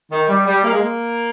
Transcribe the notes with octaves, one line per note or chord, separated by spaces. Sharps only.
D#3
G3
G3
A#3
G#3
A#3